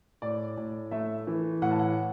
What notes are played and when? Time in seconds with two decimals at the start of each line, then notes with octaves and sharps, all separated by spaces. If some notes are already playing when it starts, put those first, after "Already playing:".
0.22 A2 D5
0.57 A2
0.91 A3 E5
1.27 E3
1.62 A2 F#5
1.71 A5
1.79 F#5